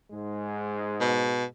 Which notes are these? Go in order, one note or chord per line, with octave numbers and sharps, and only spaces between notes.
G#2 G#3
B2